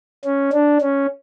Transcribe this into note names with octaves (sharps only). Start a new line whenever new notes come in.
C#4
D4
C#4